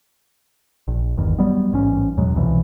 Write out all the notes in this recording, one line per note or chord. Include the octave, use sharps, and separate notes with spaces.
A#1
G1 E2 D#3
F#3 G3 B3
A1 G#2 C#4
E2 B2 F#3 G#3
C2 F2 B2 E3